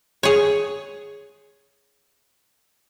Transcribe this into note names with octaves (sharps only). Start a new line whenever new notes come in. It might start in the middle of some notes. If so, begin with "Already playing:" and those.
G#4 C#5